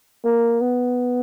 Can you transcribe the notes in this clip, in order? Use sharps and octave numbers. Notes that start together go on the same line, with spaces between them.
A#3
B3